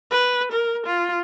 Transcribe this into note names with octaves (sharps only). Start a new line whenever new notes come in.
B4
A#4
F4